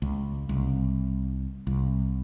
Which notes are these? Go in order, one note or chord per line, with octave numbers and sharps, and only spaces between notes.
C#2
C2
C2